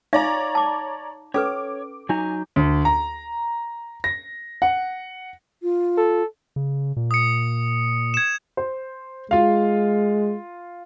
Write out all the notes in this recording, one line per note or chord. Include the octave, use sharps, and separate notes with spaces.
D#4 C#5 D5 E5 F5 A#5
A5 D6
C#4 A4 B4 C#5 D6
F#3 D#4 G#5 A#5
D2
A#5
A#6
F#5
F4
A4
C#3
A#2
D#6 C#7
G#6 E7
C5
G#3 F4 F5